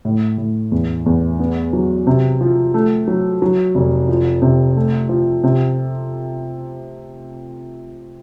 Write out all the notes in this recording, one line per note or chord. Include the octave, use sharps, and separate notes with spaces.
A2
A2
E2
E2
B3
F#3
C3
F3
A3
F#3
F#3
F1
F3
C3
A3
F3
C3